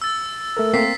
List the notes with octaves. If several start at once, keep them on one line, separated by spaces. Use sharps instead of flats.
E6 A6
A3 A4 A#4
A#3 C4 B6 C7